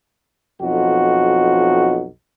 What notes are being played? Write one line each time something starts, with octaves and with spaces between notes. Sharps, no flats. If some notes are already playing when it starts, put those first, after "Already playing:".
B1 F2 D#4 F#4